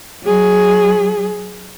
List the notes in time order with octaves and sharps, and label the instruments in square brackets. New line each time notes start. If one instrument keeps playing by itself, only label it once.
[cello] F#3 G#4